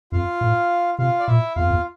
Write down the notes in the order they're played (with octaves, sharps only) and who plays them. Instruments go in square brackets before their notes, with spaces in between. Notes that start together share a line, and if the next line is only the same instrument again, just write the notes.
[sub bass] F2 [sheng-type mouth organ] F4 F5
[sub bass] A2
[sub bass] C3 [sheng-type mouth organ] F4 F5
[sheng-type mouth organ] D5
[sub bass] A#2 [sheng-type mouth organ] E4 E5
[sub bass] E2 [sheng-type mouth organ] F4 F5
[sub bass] F2
E2